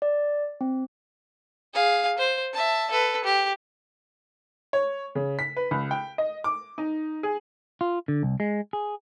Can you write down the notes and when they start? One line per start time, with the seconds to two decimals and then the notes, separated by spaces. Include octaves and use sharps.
0.02 D5
0.61 C4
1.74 G#4 F5
2.18 C5
2.53 E5 A5
2.91 A4 B4
3.24 G4
4.73 C#5
5.15 C#3
5.39 B6
5.57 B4
5.71 C#2
5.91 G5
6.18 D#5
6.44 D6
6.78 D#4
7.23 G#4
7.81 F4
8.08 D3
8.23 C2
8.40 G#3
8.73 G#4